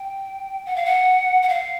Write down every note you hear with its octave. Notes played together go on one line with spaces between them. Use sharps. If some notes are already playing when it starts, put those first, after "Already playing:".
Already playing: G5
F#5
F5
F#5
F#5
F5